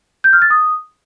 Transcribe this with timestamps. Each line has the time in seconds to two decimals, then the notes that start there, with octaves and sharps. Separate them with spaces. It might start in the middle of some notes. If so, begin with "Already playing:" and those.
0.24 G6
0.33 F6
0.42 A6
0.50 D#6